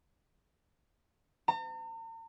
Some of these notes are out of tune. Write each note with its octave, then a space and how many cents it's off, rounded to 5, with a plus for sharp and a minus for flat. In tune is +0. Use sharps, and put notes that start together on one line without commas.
A#5 -45